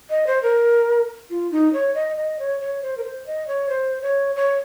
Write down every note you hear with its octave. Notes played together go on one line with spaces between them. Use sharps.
D#5
C5
A#4
F4
D#4
C#5
D#5
D#5
C#5
C#5
C5
A#4
C5
D#5
C#5
C5
C#5
C#5